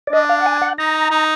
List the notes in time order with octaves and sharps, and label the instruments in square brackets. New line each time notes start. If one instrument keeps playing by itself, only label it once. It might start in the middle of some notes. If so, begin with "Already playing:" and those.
[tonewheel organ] D5
[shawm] D4 [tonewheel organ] D#5
[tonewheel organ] F5
F#5
G#5
F#5
[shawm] D#4 [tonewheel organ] A#5
[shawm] D#4